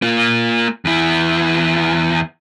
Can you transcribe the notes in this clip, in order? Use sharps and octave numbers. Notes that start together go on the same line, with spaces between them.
A#3 F4
E2 E4